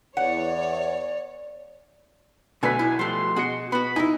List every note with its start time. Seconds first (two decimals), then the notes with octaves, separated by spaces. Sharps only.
0.17 E2 C#5 D5 F#5
2.63 B1 D3 A3 B4 G#5 B6
2.79 E4
2.99 F3 G3 A3 C6
3.36 B2 F#4 G#4 D#5 C#7
3.72 B3 F#4 B5
3.96 D#4 E4 G#5